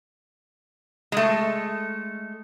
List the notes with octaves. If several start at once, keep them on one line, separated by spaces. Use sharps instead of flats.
G#3 A3